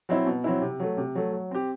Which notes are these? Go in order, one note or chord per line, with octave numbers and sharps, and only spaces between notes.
F#3 C4 E4
B2
F#3 C4 E4
C3
F#3 A3
C3
F#3 A3
F#3
C4 G4